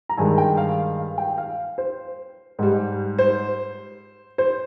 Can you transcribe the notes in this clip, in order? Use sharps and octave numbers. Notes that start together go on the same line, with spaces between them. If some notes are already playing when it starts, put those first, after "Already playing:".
A#5
G2 D#3 G#3 G#5
G5
F5
F5
G5
F5
C5
G#2 G3
C5
C5